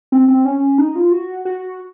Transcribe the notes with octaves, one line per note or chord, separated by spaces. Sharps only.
C4
C4
C#4
D#4
F4
F#4
F#4